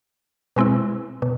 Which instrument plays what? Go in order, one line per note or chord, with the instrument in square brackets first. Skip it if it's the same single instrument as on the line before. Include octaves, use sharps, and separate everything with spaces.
[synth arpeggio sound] B2 G#3 C4 E4
B2